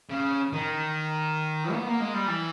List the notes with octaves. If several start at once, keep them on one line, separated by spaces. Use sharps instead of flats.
C#3
D#3
B3
A#3
G#3
G3
E3